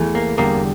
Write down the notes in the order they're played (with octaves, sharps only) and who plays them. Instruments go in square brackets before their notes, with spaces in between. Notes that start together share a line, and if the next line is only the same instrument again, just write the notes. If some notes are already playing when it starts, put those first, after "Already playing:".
Already playing: [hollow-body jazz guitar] E2 E3 A3
A#3
E2 D3 G3 A#3